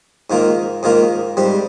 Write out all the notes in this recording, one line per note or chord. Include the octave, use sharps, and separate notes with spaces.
G#2 D#3 A#3 F4
G#2 D#3 A#3 F4
G#2 G3 C4